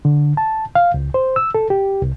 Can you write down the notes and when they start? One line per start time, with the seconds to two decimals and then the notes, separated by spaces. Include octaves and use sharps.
0.05 D3
0.37 A5
0.75 F5
0.94 C#2
1.14 C5
1.36 E6
1.55 A4
1.70 G4
2.02 C2